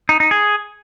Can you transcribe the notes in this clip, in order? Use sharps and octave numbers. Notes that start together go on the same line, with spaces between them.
D#4
D#4
G#4